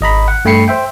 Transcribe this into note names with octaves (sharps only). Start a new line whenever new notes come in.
G#1 D#5 A#5 B5
F#5
G2 A3 G5 B5 C7 C#7
C5 E5 G5